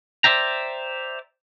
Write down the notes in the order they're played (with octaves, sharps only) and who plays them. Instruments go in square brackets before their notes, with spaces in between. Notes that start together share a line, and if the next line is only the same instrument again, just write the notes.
[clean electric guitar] C5 D5 E5 G5 A#5